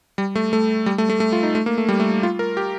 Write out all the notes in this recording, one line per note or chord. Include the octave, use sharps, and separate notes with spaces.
G3
A3
A3
G3
A3
A3
A3
F4
D#4
A3
A#3
A3
G3
A3
F4
A#4
G4